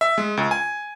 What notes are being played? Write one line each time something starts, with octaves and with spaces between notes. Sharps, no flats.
E5
G#3
C#2
G#5